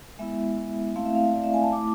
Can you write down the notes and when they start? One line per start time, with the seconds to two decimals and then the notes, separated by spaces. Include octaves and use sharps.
0.19 G#3 B3 E4 E5
0.96 A3 C4 E4 F5
1.05 E5
1.15 F5
1.24 E5
1.34 D5
1.44 E5
1.54 G#5
1.63 A5
1.72 A3 E4 D6